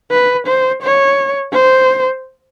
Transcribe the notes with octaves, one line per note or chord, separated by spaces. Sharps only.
B4
C5
C#5
C5